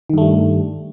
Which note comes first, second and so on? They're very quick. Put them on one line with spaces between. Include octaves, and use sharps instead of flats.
D#3 G2 A3 G3